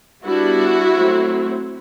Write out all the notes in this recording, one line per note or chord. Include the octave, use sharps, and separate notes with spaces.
G3 B3 D4 E4 F#4
F#3 A3 C4